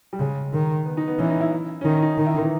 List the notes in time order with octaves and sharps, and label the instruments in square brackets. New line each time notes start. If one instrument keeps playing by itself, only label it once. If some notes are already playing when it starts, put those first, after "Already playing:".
[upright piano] G3
[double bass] C#3 [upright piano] G#3
[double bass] D#3
[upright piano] B3
D#4
B3
[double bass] E3 [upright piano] C#4
[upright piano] D#4
E4
E4
C#4
[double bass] D#3 [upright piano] D#4
[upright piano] D#4
[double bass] D#3 [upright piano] D#4
[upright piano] E4
D#4
E3